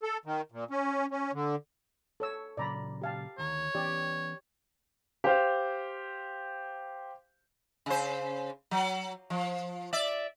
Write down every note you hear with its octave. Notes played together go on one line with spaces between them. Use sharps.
A4
D#3
A#2
C#4
C#4
D3
A4 C#5 E6
A#2 C#3 F#3 D5 A#5 B5
G4 F5 A5
D2 D#3 C#5 A#5
E3 B3 C#4 G4 D5
G4 C5 F5
C#3 C5
F#3
F3
D5 E5